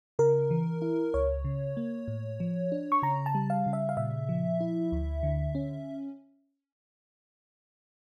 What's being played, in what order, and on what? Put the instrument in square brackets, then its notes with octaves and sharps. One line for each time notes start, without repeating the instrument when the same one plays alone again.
[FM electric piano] C#3 A#4
E3
E4
C#2 C#5
C#3
A#3
A2
F3
D4
C#6
C#3 A#5
A5
G3
F5
C#3
E5
F5
A#2 E5
F3
E4
D2
D3
C#4